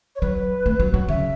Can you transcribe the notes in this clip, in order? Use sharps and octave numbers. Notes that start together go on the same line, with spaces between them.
C#5
F#3 B4
A3
F#3
F#3
C#3 E5